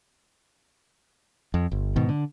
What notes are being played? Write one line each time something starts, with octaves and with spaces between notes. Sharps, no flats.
F2
G1
G#2 B2 D#3
D3